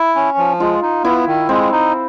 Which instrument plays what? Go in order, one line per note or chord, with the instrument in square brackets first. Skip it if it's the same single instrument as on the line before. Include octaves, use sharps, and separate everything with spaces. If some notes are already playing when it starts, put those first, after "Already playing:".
Already playing: [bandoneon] E4
C#4
F3
[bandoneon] G#3 [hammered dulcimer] F4
[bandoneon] D#4
[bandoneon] B3 [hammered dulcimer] E4
[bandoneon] D#3
[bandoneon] G#3 [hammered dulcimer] C4
[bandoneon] D#4